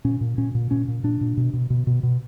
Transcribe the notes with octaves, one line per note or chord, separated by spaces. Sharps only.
A#2 C#4
A#2
A#2 C#4
A#2
A#2 C#4
A#2
A#2 D4
A#2
B2
B2
B2
B2
B2